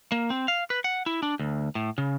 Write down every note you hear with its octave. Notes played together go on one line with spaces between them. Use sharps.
A#3
C4
F5
B4
F#5
E4
D4
D2
A2
C#3